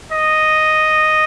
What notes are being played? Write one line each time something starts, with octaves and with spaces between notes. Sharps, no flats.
D#5